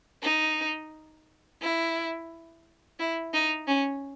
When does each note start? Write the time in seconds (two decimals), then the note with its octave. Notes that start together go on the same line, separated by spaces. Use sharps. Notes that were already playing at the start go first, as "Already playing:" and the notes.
0.23 D#4
1.61 E4
2.99 E4
3.34 D#4
3.67 C#4